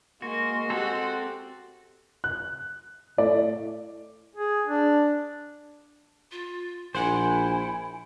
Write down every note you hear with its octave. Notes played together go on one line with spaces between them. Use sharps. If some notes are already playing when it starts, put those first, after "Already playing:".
G#3 A#3 F#4 C6
C4 F#4 G4 A4
F#6
A2 D5
G#4
D4
F4
A#1 E4 C5 F#5 G#5